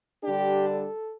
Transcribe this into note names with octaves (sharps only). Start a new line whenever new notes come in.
D3 G3 D4 G4
A4